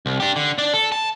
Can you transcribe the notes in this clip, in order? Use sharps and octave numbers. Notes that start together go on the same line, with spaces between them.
C2
D4 G4
D3
D4 D5
A4
A5